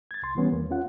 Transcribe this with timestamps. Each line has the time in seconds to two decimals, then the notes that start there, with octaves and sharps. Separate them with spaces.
0.11 G#6 A6
0.23 C2 C6
0.35 D#3 E3 G3 B3 C#4
0.52 E2 A#3
0.70 C#4 F4 F#5